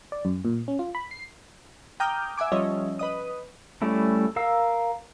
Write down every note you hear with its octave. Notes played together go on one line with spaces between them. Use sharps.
D5
F#2
A#2
C#4
F4
B5
C7
G5 A#5 D6 D#6 F6 G6
E5 F#5 G#5 D6
F3 G3 C#4 C#5 D#5 E5
B4 D#5 D#6
G3 A3 C#4 E4
A#4 F5 E6